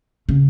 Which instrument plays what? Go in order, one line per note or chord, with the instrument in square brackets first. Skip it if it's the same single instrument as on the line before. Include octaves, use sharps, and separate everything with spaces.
[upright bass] C#3